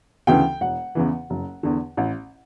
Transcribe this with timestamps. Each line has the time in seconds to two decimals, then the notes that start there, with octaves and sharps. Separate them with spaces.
0.27 D2 C#3 E3 G5
0.61 E1 F#5
0.95 E2 C#3 E3
1.30 F#1
1.63 E2 D3
1.97 A1